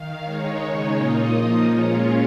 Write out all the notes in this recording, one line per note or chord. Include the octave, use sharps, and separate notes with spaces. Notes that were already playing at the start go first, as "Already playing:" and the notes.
Already playing: D#3 F5
D#3 G#3 D#4 C#5
C#3 G#3 D#4
A#2 A#3 D#4 F4 D#5
F3 A#3 D#4
A#2 G#3 C#4 F4 C#5